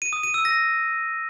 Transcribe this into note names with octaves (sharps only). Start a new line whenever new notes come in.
D#7
D#6
D#7
E6
A#6